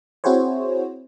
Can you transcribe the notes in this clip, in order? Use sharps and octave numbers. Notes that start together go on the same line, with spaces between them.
C4 E4 F#4 G#4 C5 C#5